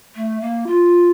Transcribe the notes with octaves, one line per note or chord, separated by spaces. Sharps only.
A3
A#3
F4